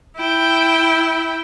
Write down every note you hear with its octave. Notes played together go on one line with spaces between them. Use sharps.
E4 G5